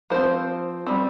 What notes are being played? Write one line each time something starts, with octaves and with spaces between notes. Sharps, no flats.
F3 C4 C5
G3 C4